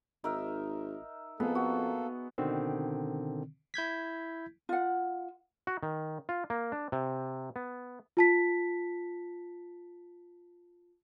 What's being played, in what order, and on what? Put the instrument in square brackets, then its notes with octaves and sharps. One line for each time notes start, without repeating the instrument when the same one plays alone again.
[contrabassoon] G#1 [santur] D#4 A#4 E5
[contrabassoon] F2 [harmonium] A#3 A4 [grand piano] B3 [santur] G#4
[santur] F#4
[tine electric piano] B2 D3 D#3 C4
E4 G6 G#6 B6
[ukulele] F4 F#5
[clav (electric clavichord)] F#4
D#3
F4
A#3
D4
C3
B3
[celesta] F4 A5 B6